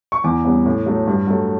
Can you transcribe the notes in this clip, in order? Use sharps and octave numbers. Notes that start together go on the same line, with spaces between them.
C#6
E2 D6
C#3 G3 B3
A2
F#3 A3
G2
F#3 A3